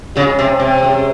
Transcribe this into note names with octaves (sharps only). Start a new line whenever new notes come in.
C#3 G#3 C#4 G#4
C3
C3
G#3 C#4 G#4